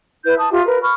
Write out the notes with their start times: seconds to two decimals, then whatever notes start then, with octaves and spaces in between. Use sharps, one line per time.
0.24 E4 B4 G6
0.38 A5 D#6
0.51 F4 G4 E5
0.65 A#4 B4
0.82 B5 C#6 F6